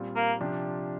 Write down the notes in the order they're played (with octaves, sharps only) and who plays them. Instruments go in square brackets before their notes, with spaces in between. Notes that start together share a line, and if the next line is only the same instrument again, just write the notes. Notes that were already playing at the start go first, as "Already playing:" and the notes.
Already playing: [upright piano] A#2 G3 C4 F4
[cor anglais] A#3
[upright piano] C3 F3 D4 G4